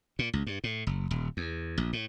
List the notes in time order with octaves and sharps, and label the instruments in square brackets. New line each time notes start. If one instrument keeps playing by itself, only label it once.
[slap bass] A#2
C#2
G2
A2
F#1
D#1
E2
A#1
A2